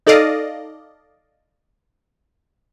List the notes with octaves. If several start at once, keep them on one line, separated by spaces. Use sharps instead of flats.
D#4 A4 D5 D#5 F5